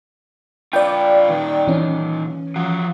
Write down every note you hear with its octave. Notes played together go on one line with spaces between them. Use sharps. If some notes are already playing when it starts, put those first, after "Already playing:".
F4 B4 D5 G5
A#2 D#3
E3 C#4
F3 F#4